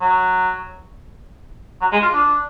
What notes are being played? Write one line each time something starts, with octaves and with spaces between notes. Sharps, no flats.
F#3
F#3
G#3
F4
D4